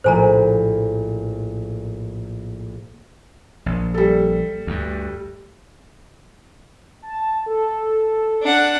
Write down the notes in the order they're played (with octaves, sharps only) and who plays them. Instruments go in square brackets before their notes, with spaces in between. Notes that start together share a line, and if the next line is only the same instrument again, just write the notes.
[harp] A#1 A2 [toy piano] C5 G#5 A#5
[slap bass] A#1
[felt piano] G3 A4
[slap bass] D2 G2
[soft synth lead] A5
A4
[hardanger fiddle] D4 F#5